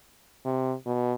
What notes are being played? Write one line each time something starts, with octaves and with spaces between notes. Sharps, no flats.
C3
B2